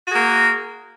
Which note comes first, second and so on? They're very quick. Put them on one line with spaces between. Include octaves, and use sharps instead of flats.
F#4 G#4 A#3